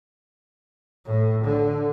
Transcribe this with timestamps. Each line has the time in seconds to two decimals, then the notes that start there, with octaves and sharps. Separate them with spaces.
1.05 A2
1.44 D3